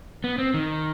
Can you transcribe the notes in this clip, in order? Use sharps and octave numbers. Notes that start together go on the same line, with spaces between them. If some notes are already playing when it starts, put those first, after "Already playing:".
B3
C4
D#3